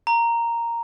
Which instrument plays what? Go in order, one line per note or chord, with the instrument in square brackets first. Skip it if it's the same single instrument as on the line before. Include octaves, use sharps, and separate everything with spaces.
[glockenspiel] A#5